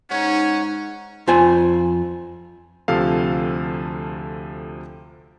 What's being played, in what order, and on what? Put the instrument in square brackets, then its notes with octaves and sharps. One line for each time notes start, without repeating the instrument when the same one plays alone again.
[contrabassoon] G#2 [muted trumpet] C#4 [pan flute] D#4 [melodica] C#5 F#5
[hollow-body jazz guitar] F2 F4 C5 G#5
[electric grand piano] D2 C3 F3 A4 F5